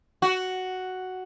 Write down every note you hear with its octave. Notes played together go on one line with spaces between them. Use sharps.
F#4